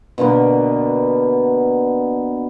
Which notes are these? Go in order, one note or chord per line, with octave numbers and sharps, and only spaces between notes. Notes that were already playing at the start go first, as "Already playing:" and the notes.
B2 D3 A#3 B3